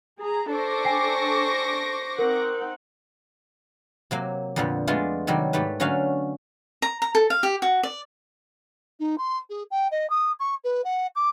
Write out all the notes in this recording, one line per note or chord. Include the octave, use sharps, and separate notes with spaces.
G#4 A#5
D4 A4 C5 C#6 D6 A#6
G5 G#5 C7
C4 D#4 A#4 F#5
C3 F#3 A#3
F2 A#2 D3 F3 B3
G#3 A3 B3 D4 F4 G#4
C3 D#3 F#3 G3
G#2 A3 G4 B4
D3 F#3 A3 C#4 F#4 F5
A#5
A#5
A4
F5
G4
F#4
D5
D#4
C6
G#4
G5
D#5
D#6
C#6
B4
F#5
D6